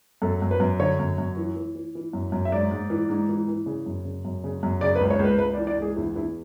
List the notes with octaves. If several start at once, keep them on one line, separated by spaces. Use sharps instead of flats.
F#2 A4
F#2
B4
F#2
D3 C#5
F#2
F#2
E3
E3
E3
E3
F#2
F#2
E5
G#2 D5
G#2
E3
G#2
E3
E3
C#3
F#2
C#3
F#2
C#3
F#2
C#3 D5
B4
C#2
C#5
C#2 B4
C#2 B4
D5
E3
D5
C#2 G#4
E2 E4
E2 E4